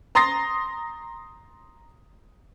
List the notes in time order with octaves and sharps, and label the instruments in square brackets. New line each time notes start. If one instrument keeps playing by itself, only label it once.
[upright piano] A#5 C6 D#6 A6 A#6 C7